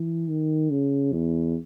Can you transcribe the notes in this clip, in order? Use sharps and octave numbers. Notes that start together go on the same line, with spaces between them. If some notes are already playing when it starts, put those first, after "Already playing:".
Already playing: E3
D#3
C#3
E2